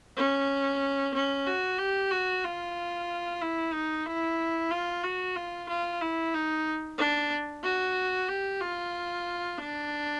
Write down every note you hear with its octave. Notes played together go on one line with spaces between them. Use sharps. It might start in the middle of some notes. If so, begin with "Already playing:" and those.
C#4
C#4
F#4
G4
F#4
F4
E4
D#4
E4
F4
F#4
F4
F4
E4
D#4
D4
F#4
G4
F4
D4